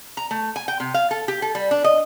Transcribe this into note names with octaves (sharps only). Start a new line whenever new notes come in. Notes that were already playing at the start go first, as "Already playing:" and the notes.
A#5
A3
G#5
G5
C3
F5
A4
G4
A4
G3
D4
D#5